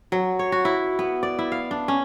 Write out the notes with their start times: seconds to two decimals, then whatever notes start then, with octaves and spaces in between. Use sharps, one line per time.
0.12 F#3
0.39 C#5
0.52 F#4
0.65 E4
0.99 B3
1.23 D5
1.39 E4
1.52 F5
1.71 D4
1.88 C#4